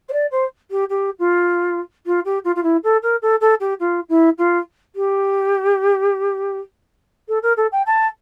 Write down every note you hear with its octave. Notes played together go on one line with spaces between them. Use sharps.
C5
D5
C5
G4
G4
F4
F4
G4
F4
F4
E4
A4
A#4
A4
A4
G4
F4
E4
F4
G4
A4
A#4
A4
G5
A5